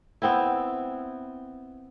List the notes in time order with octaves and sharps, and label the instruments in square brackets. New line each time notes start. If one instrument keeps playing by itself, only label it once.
[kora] B3 C4 E4